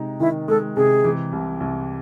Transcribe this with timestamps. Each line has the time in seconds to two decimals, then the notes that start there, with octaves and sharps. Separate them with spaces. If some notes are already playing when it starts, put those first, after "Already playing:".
Already playing: C3 G#3 D#4
0.20 D#3 E4
0.48 G#3 A4
0.76 C3 G#4
1.04 E3
1.32 C2
1.60 C2